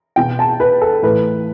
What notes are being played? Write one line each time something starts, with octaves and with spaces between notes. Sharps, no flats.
B2 G5
A5
B4
A4
A2 E3 B4